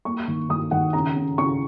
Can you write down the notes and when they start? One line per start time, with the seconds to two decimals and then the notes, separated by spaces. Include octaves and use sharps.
0.05 A#3 C#6
0.28 D#3
0.49 D#3 D#6
0.71 D#3 F#5
0.93 C#3 A#5
1.16 C#3
1.38 C#3 C#6